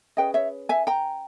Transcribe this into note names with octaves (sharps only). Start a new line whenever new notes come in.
C#4 G#4 B4 D#5 G5
C#5 E5
E5 G#5
G5 A#5